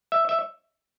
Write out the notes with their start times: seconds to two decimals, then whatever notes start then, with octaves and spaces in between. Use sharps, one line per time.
0.12 E5
0.29 E5